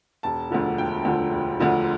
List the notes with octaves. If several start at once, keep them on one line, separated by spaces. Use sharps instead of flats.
E1 A5
D2 D3 F3
E1 G5
D2 D3 F3
E1
D2 D3 F3